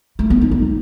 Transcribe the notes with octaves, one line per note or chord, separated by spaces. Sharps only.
A3
B3
D#4
D#4